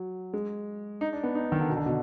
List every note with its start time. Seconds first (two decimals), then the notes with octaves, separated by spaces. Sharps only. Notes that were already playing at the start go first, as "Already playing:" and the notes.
Already playing: F#3
0.34 G#3
1.01 D#4
1.13 D4
1.23 B3
1.35 D#4
1.44 D4
1.52 D#3
1.60 D3
1.69 B2
1.77 D3
1.86 B2